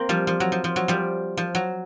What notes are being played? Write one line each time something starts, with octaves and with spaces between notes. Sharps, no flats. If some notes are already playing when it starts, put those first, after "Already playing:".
Already playing: A#3 C4
F3 G3
F3
F#3
F3
F3
F#3
F3 G3
F3
F#3